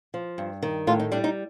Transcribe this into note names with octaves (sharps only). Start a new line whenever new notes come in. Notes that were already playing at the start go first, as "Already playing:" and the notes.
F3
G2
D#3
A2 F4
D#4
G3 D4
D#4